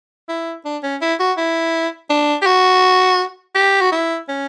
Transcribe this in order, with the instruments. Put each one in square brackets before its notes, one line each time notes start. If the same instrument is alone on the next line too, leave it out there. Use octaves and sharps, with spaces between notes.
[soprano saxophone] E4
D4
C#4
E4
F#4
E4
D4
G4
F#4
G4
F#4
E4
C#4